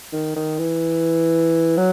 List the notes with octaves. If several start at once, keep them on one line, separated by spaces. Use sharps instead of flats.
D#3
D#3
E3
F#3